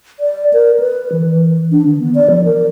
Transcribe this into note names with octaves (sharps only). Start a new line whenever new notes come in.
D5
A#4
B4
E3
E3
D4
D#3
B3
D5
F3
A#4